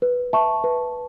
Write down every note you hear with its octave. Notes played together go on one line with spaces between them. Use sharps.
B4
E5 A5 C#6
B4